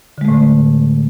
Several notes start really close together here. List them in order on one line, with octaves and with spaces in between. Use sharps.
D3 G#3 A3 A2